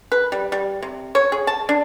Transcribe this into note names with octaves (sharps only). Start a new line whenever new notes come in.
B4
G3
G3
C3
C#5
G#4
A5
D4